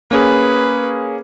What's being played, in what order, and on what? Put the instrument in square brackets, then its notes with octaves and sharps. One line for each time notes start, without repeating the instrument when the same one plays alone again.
[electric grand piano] A#3 C#4 G#4 [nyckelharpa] B4